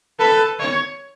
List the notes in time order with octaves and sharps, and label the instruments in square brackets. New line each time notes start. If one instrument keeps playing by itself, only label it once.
[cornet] A4 [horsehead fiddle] B4
[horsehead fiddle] C#5